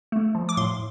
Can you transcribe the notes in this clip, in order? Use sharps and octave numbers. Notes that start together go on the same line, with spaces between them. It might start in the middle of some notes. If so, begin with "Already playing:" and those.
A3
F3
D6
A2 C6